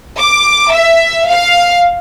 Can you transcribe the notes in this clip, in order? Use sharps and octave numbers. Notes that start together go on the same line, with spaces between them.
D6
E5
F5